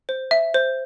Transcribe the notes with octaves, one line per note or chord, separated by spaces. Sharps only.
C5
E5
C5